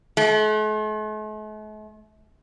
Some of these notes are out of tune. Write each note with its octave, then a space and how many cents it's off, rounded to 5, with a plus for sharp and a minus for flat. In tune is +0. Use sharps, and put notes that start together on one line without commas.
A3 -45